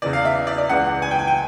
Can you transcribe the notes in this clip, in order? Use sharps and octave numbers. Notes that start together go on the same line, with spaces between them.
E2 C#3 E3 D5
F5
E5
D5
D5
C#2 C#3 E3 F#5
G#5
G5
G#5
G5